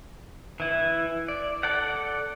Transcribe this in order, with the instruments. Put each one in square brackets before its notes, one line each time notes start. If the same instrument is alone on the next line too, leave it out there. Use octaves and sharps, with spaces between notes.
[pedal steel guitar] E3 E4
D5
A4 D5 F#5